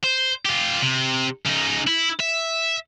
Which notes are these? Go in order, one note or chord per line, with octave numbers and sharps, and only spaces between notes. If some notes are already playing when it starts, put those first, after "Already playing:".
C5
F4 G4
C3
C#3 D#4
E4
E5